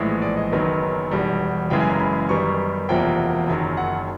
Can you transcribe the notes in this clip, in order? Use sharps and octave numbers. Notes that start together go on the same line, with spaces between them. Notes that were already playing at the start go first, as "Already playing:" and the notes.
Already playing: A#1 A2 E3 G#3
D5
D#5
F#1 F#2 D#3 F#3 B3
E1 E2 B2 G3
F#1 F#2 C#3 E3 G#3 G5
G#5
A#5
B5
F#2 D#3 G3 B3 D#4 C#6
E1 E2 C3 F3 A#3 G5
F#1 F#2 D#3 F#3
F#5